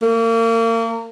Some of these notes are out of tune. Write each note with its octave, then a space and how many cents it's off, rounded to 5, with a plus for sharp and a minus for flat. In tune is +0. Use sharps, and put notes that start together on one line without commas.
A#3 -35